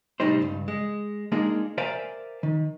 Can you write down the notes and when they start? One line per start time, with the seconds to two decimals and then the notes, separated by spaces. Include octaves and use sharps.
0.20 C2 A2 G3 D4 D#4 C5
0.41 C#2 G2
0.68 G#3
1.32 G#3 A#3 D4 D#4 F4 G#4
1.78 A#4 C5 D5 E5 F5 G#5
2.43 D#3